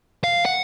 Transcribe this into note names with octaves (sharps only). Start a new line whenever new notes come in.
F5
F#5